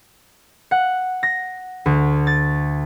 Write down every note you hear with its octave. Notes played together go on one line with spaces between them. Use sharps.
F#5
A#6
D2
A6